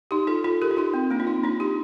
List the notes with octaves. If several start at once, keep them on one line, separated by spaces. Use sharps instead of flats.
D#4 G4
F4 A4
F4 A4
G4 A#4
F4
D#4 G4
C4
A#3 D4
F4
C4 D#4
D4 F4
D#4 G4